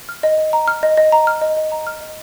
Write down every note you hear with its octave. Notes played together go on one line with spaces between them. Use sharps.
F6
D#5
D#5
A#5
F6
D#5
D#5
A#5
F6
D#5
D#5
A#5
F6
D#5